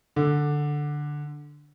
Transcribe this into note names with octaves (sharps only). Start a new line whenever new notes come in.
D3